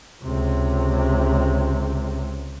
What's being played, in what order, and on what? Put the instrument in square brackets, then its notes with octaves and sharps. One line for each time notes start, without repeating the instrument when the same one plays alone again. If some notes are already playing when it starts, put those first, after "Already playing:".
[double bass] C#2 C3